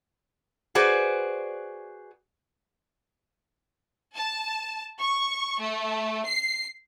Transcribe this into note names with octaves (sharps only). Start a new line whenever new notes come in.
F#4 G#4 B4 C5 D5
A5
C#6
A3
C7